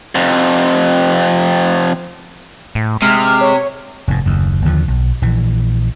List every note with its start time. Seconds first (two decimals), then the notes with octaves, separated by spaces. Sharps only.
0.15 F2 C3
2.75 A2
3.02 C3 G#3 F6
3.41 C#5
4.08 F1 G#2
4.26 F#1 D#2
4.65 D#2 D3 F3
4.88 B1
5.22 A#1 E3